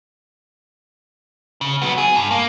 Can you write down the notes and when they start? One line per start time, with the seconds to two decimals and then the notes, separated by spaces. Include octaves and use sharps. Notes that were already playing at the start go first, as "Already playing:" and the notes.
1.61 C#3
1.82 F#3 B3
1.98 G#4
2.15 G2
2.31 A#3